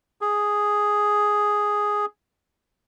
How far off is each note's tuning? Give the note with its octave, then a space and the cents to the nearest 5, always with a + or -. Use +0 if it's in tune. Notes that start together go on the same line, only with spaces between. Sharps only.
G#4 +0